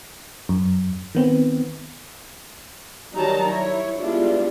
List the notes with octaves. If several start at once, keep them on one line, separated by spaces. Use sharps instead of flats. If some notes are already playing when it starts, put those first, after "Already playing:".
F#2
D#3 B3 C4
D#3 F#3 G3 D#4 A5 A#5
E4 C#5
G3 G#3 B3 D4 E4 F4